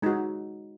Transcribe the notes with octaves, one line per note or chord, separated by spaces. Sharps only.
G#3 D#4 F#4